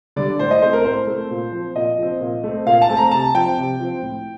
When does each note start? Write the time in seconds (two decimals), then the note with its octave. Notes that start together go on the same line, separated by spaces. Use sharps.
0.16 D3 G3 D5
0.39 A2 C5
0.51 D#5
0.62 A3 C4 C5
0.73 A#4
0.84 A2 C5
1.07 A3 C4
1.30 A#2
1.52 F3 C4
1.75 A#2 D#5
1.98 F3 C4
2.21 A#2
2.44 A3 C4
2.66 A#2 F5
2.82 A5
2.89 A3 C4
2.97 A#5
3.11 C3 A5
3.34 F3 C4 G5
3.57 C3
3.80 F3 C4
4.02 A2